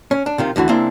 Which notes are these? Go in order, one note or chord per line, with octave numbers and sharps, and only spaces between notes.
C#4
D4
C3 D#3 F4
D2 D3 E3 F#4
C#2 A#3 C4 D4 E4 C6